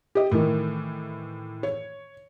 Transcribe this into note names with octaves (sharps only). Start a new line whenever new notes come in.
G4 D#5
A2 D#3 E3
C#5